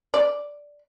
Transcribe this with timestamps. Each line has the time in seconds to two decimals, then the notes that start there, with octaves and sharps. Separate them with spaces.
0.14 D5